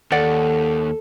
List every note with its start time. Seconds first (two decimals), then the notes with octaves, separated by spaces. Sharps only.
0.12 D#2 A4 D5 F#5